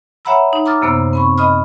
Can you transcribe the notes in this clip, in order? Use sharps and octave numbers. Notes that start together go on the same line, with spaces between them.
C#5 E5 F#5 A#5 B5 E6
D#4
A#5 D6 D#6 F6 A6
F#2 C3 A#3 B3 C5
C4 B5 C#6
D#5 B5 D#6 F6